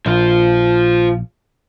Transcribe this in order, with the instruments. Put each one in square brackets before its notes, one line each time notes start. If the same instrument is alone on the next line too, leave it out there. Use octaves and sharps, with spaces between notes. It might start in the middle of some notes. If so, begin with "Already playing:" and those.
[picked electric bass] A#1 [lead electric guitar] F3 F4